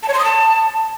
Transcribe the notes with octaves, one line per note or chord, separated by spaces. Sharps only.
A5
C#5
C6
D#6
A5